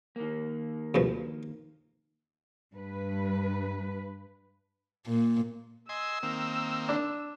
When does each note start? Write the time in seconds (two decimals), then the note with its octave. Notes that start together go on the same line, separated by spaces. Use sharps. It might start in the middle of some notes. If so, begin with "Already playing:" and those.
0.16 D#3 A#3
0.94 D2 G2 F3
2.74 G2 B4
5.07 A#2
5.89 D#5 G#5 C6 E6
6.23 D#3 A#3 C4
6.89 D4